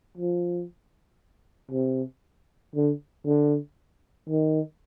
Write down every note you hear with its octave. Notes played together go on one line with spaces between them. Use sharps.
F3
C3
D3
D3
D#3